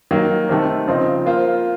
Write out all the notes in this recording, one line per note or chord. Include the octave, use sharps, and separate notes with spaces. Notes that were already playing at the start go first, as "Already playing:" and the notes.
D#3 F#3 A#3
C3 D#3 A3
C#3 F3 C4 D#4
A#3 F4 C5